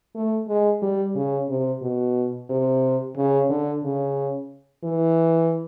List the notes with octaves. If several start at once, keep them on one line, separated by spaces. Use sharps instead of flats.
A3
G#3
G3
C#3
C3
B2
C3
C#3
D3
C#3
E3